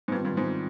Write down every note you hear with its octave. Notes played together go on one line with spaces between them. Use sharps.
G#2
G2 D#3 G3 C4 F4
G2
G#2